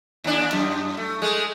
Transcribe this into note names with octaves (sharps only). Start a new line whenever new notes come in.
D#2 D4
F#2
A3
G#3 A3